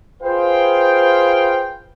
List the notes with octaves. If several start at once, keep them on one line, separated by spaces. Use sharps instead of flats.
F4 G#4 B4 C5 F5 G5